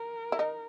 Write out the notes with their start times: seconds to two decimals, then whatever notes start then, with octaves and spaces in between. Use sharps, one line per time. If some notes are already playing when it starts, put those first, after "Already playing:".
Already playing: A#4
0.32 E4
0.39 D#4